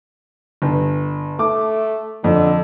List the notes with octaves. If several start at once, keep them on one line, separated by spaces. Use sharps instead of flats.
G1
A3 D6
F2 D3